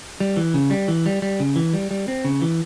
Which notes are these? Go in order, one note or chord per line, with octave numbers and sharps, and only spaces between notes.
G3
E3
C#3
G3
E3
G3
G3
C#3
E3
G3
G3
C4
C#3
E3